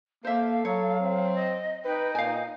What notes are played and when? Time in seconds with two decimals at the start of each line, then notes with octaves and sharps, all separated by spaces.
0.25 A#3 A4 C5 E5 F5
0.65 F#3 C#5
1.01 C4
1.35 D#5
1.85 D#4 B4 G5
2.15 A#2 F5 G#5